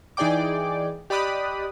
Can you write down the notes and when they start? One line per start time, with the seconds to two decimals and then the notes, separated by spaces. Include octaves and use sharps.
0.17 E3 D#4 G#4 D5 G5 D6
1.10 G4 D5 D#5 B5 D#6 F#6